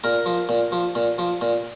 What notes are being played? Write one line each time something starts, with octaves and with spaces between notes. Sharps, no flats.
A#2 A#4
F3
A#2
F3
A#2
F3
A#2